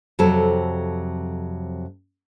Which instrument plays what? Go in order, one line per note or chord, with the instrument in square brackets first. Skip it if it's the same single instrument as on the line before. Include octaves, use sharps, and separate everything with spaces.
[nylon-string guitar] F2 C3 F#3 A4